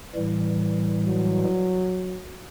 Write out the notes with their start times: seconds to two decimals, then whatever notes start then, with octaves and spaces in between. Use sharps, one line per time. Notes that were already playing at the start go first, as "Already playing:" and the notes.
0.15 A2 E3 G3
1.07 F#3